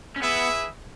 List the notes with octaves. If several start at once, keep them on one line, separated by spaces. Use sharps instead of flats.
C#4
B3 E4 G#4 B4 E5